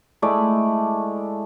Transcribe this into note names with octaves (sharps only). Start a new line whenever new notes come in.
G#3 A3 E4 D5